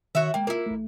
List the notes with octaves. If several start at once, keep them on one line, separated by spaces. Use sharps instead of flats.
D#3 F#4 C#5 E5
G#3 A#3 G5
A#3 E4 F4 A#4
A1 A3